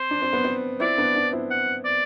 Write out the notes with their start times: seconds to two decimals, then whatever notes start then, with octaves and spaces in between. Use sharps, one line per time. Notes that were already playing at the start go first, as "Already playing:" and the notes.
Already playing: C4 C5
0.11 D4
0.22 C4
0.33 B3
0.44 C4
0.80 C4 E4 D5
0.98 B3 D4
1.15 B3 D4
1.33 C4 E4
1.51 F#5
1.85 D5